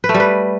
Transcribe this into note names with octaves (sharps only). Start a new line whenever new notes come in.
B4
A3
G3
B4